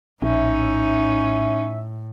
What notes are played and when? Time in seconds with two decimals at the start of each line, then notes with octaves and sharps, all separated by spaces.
0.22 A#1 A2 C#4 D#4 E5